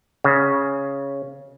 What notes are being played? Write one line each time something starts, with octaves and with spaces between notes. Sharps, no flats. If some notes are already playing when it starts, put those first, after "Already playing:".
C#3